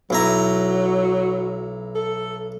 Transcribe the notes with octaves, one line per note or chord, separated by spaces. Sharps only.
B1 F#3 E4 A#5
A4